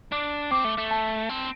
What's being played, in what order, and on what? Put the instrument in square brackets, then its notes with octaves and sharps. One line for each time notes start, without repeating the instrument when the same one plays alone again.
[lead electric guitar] D4 [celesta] D6
[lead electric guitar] C4 [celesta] D6
[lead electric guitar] A3
A3
[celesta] A5
[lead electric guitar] C4